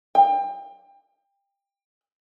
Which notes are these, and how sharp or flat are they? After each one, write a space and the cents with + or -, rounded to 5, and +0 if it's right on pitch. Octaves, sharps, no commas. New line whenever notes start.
G5 +25